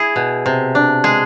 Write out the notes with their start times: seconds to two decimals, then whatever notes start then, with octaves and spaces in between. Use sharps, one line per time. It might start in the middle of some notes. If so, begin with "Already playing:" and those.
Already playing: E4 G#4
0.16 B2
0.46 C3
0.75 D4
1.04 G#3 G#4